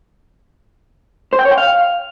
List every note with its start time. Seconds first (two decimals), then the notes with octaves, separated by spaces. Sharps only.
1.33 C5
1.39 G5
1.45 C#5
1.51 G5
1.58 F5